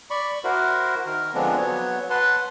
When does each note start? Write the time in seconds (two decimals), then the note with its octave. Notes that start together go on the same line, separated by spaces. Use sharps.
0.11 D5 B5 C#6
0.44 E4 F#4 A#4 C5
1.06 D#3 A#4
1.34 D3 F3 G#3 B3 C4 D4
1.57 F#3 B3 C#5
2.10 B4 F#5 A5 C6